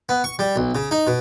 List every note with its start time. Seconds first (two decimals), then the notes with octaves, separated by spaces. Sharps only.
0.09 B3
0.24 C#6
0.39 G3
0.56 B1
0.75 C#3
0.91 D#4
1.07 B2